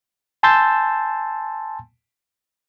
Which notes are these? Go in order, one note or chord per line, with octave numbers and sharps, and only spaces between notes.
G#5 A5 C6 E6 G6 A6